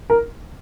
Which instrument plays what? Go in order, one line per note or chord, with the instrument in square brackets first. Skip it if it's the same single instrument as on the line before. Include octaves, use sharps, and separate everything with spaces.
[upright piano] A#4